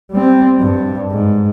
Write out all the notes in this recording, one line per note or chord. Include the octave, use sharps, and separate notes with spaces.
G3 C4
G2
G#2